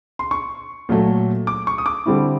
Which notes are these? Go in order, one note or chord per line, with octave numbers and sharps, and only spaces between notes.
C6
C#6
A#2 F#3 A3
D6
C#6
D#6
D6
D3 G3 C4 E4